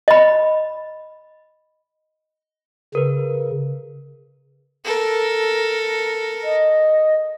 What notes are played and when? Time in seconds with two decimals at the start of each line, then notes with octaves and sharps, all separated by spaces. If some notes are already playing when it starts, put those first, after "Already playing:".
0.08 D#5 B5
2.95 C#3 A#4 B4
4.84 A4 A#4
6.44 D#5